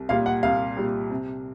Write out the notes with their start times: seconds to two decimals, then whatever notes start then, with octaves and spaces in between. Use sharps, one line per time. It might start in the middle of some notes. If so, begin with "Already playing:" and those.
Already playing: C2
0.09 A#2 G3 F5
0.26 F#5
0.43 C2 F5
0.77 A#2 G3
1.10 C3